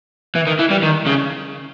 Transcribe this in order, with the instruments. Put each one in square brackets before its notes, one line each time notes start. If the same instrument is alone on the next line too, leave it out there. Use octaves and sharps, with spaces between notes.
[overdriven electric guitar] E3
D#3
E3
G3
D#3
C#3